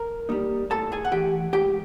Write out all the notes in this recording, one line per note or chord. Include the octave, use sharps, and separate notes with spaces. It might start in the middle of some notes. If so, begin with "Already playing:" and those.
Already playing: A#4 A#5
G3 A#3 D#4
A2 A4 A5
G#4 G#5
F#5
E3 A3 G4 G5
G#2 G4 G5